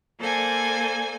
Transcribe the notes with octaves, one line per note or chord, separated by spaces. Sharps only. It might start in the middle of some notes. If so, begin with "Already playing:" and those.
A#3 A4 C5 D5 G#5